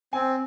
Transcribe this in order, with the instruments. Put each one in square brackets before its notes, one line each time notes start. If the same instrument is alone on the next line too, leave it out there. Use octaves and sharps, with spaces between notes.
[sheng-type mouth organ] C4 [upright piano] G#5